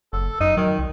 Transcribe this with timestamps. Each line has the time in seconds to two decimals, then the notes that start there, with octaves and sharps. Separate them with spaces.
0.13 F#1 A4
0.40 F#2 D#4
0.57 D#3 F#3
0.79 C2